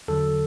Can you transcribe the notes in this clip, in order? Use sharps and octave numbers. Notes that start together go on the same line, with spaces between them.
E2 D3 F#3 A4